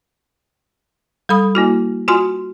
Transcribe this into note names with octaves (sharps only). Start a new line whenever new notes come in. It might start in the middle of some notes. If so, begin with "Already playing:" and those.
G3 A4 B5 D#6
A#3 E4 F#4
F4 F#4 G#5 C6